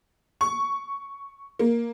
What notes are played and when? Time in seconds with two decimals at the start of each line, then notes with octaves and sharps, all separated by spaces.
0.41 C#6
1.59 A#3